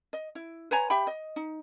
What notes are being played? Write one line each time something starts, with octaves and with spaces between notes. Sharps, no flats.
D#5
E4
B4 C#5 G#5 A#5
G4 E5 G5 B5
D#5
D#4